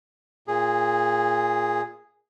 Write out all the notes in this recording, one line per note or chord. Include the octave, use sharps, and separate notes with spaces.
A#2 G#4